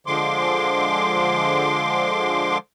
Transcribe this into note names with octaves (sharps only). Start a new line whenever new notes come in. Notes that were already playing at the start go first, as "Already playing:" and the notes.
D3 F3 G#3 C6 D6